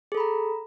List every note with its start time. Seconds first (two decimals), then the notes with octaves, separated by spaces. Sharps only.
0.12 G#4
0.15 A4
0.17 B5
0.20 A#5